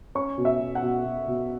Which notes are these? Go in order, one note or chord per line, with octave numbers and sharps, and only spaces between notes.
C#4 C#6
B2
E5
B2
F#5
B2
B2
B2